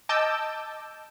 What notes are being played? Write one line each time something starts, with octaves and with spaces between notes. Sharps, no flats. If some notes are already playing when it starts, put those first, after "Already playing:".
D#5 A5 D6 E6 G6